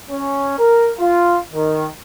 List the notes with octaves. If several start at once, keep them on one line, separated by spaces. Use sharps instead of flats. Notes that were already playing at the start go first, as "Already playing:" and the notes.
C#4
A#4
F4
D#3